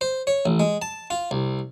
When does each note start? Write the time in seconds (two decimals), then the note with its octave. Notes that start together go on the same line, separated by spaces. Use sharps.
0.01 C5
0.27 C#5
0.46 A1
0.60 G#3
0.82 A5
1.10 F4
1.31 C2